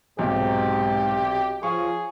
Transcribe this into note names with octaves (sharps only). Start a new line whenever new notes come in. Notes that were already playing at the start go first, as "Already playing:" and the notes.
B1 G#2 C3 G4
F3 G#4 C#5 F5 C#6